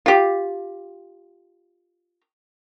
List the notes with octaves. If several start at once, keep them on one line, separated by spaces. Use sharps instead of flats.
F4 G4